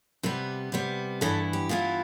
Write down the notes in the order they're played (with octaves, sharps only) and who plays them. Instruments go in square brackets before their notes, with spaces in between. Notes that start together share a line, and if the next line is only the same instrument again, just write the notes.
[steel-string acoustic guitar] C3 G3 B3 B4
C3 G3 B3
G2 E3 B3 E4 A4
G4
G2 E3 B3 E4 F4